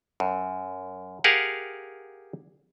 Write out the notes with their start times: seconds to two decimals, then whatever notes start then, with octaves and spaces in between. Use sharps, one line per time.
0.20 F#2
1.24 G4 G#4 A#4 F5 F#5